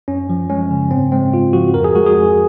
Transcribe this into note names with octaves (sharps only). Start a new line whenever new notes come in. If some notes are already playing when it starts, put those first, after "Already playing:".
F#2 C#4
F3
G#3 C#4
C#3
G#2 C4
G#3 C4
G#2 F4
F3 F#4
F2 A#4
G#4
G#3 F#4
G#4
F2